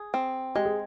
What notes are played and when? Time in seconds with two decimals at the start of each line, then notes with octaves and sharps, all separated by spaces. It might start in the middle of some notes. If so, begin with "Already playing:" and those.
Already playing: G#4
0.14 C4
0.55 G#3 G4
0.65 G#4